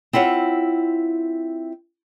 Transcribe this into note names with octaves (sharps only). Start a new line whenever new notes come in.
C4 E4 F4 C#5 F#5